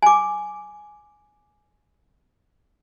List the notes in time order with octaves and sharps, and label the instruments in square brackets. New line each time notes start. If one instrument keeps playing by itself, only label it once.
[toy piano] G#5 D6